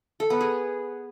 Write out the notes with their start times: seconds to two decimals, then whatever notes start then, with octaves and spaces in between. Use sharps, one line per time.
0.20 A4
0.30 B3
0.41 G#4